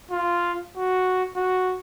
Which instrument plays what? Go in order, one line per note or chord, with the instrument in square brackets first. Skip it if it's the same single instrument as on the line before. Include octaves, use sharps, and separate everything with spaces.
[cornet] F4
F#4
F#4